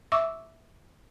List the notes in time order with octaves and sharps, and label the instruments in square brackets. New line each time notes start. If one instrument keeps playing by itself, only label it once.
[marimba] E5 C#6 D6 E6